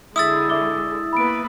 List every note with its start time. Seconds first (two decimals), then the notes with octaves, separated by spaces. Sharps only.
0.16 D3 G#3 E4 D#6 E6 A6
0.50 E5 D6 G7
1.13 A#3 B3 B4 B5 D7